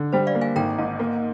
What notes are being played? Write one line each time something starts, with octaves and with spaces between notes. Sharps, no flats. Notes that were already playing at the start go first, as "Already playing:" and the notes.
Already playing: D3
G3 C5
D5 F5
A#3
F5 G#5
G#1 G5 A#5
G#2
A#3